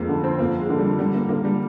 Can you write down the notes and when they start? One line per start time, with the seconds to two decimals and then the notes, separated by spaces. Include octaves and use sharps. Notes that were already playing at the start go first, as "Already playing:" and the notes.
Already playing: F2 G#3 A#3
0.09 D3
0.24 C4
0.39 F2 A#3
0.60 G#3
0.70 D3
0.79 G3
0.99 D3 G3
1.14 A#3
1.29 D3 A#3
1.45 G3